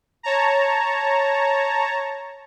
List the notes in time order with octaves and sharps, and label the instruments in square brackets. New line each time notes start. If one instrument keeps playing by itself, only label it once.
[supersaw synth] C#5 A5 A#5